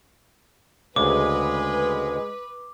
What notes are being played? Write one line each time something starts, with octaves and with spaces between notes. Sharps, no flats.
D2 C#3 G#3 B4 D6